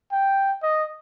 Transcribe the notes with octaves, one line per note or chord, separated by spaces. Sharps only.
G5
D#5